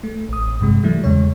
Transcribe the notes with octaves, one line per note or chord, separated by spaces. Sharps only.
A3
A1 D#6
G2 C3 G#3
E3 F#3 G3 A3 E4
E2 C#3 G#3 C#5